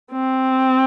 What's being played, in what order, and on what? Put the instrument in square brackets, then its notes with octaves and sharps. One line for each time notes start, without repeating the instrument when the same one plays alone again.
[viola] C4